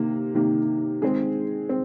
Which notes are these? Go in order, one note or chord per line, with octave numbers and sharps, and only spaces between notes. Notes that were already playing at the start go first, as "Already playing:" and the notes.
Already playing: C3 D#3 A#3
C3 D#3 A#3
D#3 G#3 C4 G#4
C4